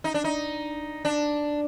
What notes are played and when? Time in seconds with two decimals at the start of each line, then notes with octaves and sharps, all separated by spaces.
0.04 D#4
0.14 D4
0.24 D#4
1.05 D4